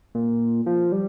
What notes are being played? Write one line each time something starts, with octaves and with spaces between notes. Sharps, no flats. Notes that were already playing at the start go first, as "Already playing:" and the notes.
A#2
F3
G3